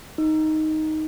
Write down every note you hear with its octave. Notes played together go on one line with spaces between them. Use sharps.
D#4